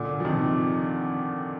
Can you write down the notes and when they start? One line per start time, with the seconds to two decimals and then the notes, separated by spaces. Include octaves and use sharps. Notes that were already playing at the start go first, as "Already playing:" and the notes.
Already playing: A#2 D3
0.20 F3
0.25 C3 D#3